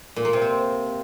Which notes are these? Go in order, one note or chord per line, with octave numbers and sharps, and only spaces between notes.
A#2
A#3
C3
C4